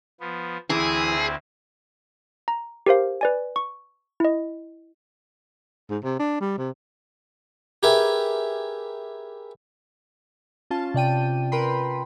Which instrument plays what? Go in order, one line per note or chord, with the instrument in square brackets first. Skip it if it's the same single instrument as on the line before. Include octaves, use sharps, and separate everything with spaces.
[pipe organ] F3 B3
[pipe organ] D2 C4 E4 [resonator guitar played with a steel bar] E3 [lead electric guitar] G#4
[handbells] A#5
G4 A#4 C5 F5
B4 D5 G#5
C#6
E4 D#5
[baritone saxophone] G#2
C3
D4
G3
C3
[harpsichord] G4 G#4 A#4 B4 E5 G#5
[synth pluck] C#4 F4 A5
C3 D5 G5 D#7
A#4 B4 G5 B5 C6